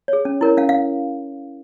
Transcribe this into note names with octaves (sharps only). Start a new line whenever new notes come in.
G#4 C#5
C#4
E4 A#4 C#5
C#4 F5
F5